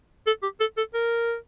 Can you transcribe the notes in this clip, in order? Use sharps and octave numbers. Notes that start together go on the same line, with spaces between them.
A4
G4
A4
A4
A#4